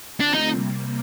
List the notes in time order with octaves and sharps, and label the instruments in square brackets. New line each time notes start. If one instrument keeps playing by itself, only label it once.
[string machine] D3 A3 C4 F4 [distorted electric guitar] D4
[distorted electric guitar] D#4
[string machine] C3 G3 A#3